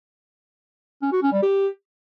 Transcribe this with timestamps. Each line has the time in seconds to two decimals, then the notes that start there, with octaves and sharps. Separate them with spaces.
1.02 C#4
1.12 F#4
1.22 C#4
1.32 G3
1.42 G4